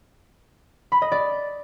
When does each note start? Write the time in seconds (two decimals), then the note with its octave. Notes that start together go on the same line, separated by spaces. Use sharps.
0.92 B5
1.02 D#5
1.12 D5